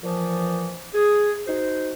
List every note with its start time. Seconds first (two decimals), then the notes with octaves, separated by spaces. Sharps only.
0.04 A#2 E3 F3
0.95 G#4
1.48 D#4 F#4 C5